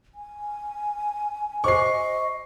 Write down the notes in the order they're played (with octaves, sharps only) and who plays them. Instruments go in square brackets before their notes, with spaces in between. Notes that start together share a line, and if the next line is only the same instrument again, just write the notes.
[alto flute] G#5
[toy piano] F#4 C5 D6 [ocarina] D#5 [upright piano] C#6 C7